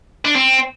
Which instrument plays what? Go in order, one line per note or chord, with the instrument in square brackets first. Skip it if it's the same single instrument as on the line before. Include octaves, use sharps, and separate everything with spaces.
[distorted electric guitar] D4
C4